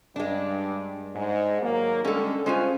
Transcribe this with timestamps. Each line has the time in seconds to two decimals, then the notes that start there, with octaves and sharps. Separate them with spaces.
0.16 G2 G#3 D4
1.15 G#2
1.62 D#2 F#3 A#3
2.05 D3 G3 G#3 C#4 A4
2.46 G#3 C#4 F4 G#4 C5 G#5